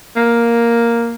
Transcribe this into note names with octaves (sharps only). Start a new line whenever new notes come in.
A#3